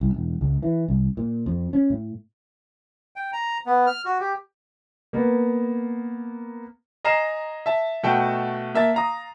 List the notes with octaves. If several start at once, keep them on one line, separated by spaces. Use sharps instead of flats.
C2
E1
C#2
E3
C2
A#2
F2
C#4
A2
G5
A#5
B3
F6
F#4
G4
A#3 B3
D#5 G#5 A#5 F6 C7 E7
E5 A5
B2 A3 F#4 G5 A5
A#3 E5 A5 A6
F5 A#5 D#6